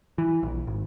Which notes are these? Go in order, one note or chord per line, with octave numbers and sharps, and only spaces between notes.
E3
A#1
G#1